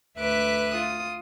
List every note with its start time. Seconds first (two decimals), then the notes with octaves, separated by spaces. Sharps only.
0.17 D2 B4 E5 D6 F#6
0.72 F4 D#6